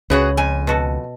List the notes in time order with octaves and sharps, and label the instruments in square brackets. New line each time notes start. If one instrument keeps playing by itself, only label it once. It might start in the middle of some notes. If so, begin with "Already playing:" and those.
[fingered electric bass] C#2 [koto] C#3 [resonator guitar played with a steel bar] F#4 G#4 B4
[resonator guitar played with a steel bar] F2 G#5
[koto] B2 F#4 A4